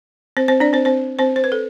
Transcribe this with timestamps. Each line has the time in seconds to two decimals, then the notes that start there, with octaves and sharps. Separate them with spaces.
0.37 C4 C5
0.48 C4 C5
0.60 D4 D5
0.73 C4 C5
0.85 C4 C5
1.19 C4 C5
1.36 C5
1.44 B4
1.52 A4